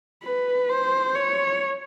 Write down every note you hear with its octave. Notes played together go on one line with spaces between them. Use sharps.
B4
C5
C#5